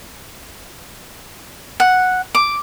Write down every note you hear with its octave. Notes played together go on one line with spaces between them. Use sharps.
F#5
D6